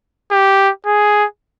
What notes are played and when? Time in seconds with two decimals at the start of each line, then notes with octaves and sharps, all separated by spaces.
0.31 G4
0.86 G#4